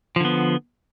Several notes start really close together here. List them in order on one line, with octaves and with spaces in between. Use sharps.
F3 D3 B3